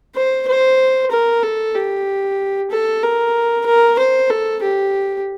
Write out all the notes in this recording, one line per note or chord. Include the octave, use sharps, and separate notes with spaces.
C5
C5
A#4
A4
G4
A4
A#4
A#4
C5
A4
G4